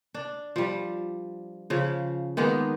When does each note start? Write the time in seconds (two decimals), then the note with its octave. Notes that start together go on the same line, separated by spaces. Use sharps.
0.14 D4
0.56 F3 G3
1.70 C#3 F3
2.37 D#3 G#3 A#3 B3